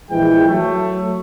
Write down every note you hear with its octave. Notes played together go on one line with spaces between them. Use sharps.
A#1 E3 G#3 G5
F#3 A3